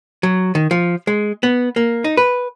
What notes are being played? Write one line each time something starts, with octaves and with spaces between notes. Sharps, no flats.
F#3
D#3
F3
G#3
B3
A#3
D#4
B4